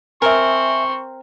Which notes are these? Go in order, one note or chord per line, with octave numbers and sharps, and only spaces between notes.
C4 A#4 E5 G#5 C#6